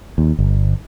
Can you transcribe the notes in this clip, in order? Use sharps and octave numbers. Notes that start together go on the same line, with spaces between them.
D#2
G1